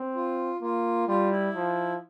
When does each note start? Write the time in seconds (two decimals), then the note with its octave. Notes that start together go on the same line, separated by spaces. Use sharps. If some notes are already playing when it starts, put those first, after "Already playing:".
Already playing: C4
0.15 F4
0.61 A#3 F4
1.07 G3 F4
1.31 E4
1.54 F3